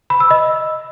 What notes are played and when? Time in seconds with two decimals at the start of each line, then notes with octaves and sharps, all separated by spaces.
0.10 B5
0.20 E6
0.31 D#5